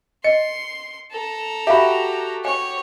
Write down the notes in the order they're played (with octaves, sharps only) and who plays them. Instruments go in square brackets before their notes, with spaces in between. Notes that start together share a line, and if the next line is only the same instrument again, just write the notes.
[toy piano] D#5 [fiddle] C6 [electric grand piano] C#7
[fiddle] A4 A#5
[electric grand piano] F#4 G4 [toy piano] E5 F5 B5
[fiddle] C#5 [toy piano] G5 G#5